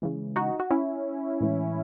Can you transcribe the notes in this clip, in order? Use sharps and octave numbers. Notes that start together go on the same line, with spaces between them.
C#3 E3 G#3
D#4 F#4
F#4
C#4 E4
A2 E3 G#3